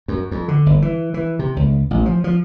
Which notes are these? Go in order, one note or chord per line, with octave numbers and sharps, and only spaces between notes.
F#2
F2
D3
G1
E3
E3
C3
C#2
A1
F3
F3